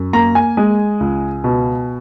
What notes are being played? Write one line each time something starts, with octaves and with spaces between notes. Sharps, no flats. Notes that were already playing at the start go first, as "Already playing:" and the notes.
Already playing: F#2
A#3 A#5
G#5
G#3
C#2
B2